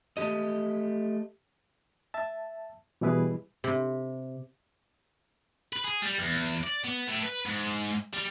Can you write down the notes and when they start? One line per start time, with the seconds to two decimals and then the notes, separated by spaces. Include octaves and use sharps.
0.17 A3 G4 D#5
2.14 E5 A5
3.01 B2 E3 G3 E4 G#4 B4
3.64 C3
5.73 B4
5.85 G#4
6.02 G3
6.19 E2
6.63 D5
6.84 B3
7.08 A2
7.23 B4
7.46 G#2
8.14 G3